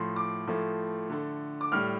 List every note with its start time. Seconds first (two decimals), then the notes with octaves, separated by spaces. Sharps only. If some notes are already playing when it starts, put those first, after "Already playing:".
Already playing: A2 F3 A3 C6
0.16 D6
0.47 A2 F3 A3
1.09 D3 A3
1.61 D6
1.72 A2 G3 F6